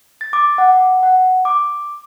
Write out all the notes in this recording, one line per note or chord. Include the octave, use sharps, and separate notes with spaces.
A6
D6
F#5
F#5
D6